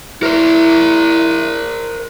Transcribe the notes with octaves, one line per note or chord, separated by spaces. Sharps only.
E4 A#4 C5